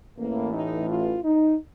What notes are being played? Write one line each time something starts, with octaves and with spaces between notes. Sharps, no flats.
A1 A2 E3 A#3
D#4
F4
D#4